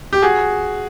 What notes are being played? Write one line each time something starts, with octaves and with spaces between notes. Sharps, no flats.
G4
F#4 G#4